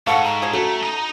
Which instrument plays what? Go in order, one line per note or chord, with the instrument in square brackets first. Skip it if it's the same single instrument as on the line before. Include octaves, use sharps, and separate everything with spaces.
[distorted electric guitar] G#2 [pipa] C4 A4 F5 [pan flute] F#5 [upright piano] C#6
[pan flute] A#5
[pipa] F3 F#3 G#4
[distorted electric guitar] A3 [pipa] C#4 [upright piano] F#4 A4
[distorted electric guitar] D#4 D#5